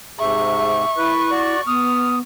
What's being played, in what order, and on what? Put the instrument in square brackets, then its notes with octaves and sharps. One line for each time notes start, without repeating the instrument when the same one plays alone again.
[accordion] G#2 C3 [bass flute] G#4 [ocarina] E5 [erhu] C#6
[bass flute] E4 [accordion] B4
[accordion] F#4 D5
[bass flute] B3 [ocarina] D#6 [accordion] F6